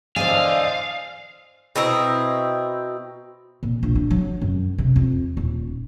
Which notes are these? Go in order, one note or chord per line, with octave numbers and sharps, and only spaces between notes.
E2 D3 C5 D5 D#5 F5 G#5
B2 C4 E4 A#5
A#2
A#1
D4
F#3
F#2
C3
F2
D#1